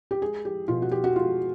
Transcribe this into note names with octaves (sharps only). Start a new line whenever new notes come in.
G4
G#3 G#4
G4
B2 F4
F#4
G4
F#4
G#3 F4